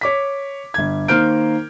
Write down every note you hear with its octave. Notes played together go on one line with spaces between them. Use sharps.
C#5 D6 B6
G1 G#6
D#3 A#3 C5 F6 G6 D7